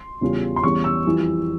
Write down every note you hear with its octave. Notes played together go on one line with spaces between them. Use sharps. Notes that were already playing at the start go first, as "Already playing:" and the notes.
Already playing: C6
E2 C#3 G3 C#4 F4
C6
E2 E3 G3 C#4 C#6
E6
F2 E3 G3